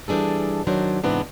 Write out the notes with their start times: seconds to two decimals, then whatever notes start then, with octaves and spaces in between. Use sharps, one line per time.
0.08 E3 G3 D4 G#4 A4
0.67 D#3 F#3 D4 C5
1.04 G#2 C3 E3 B3 C4 D4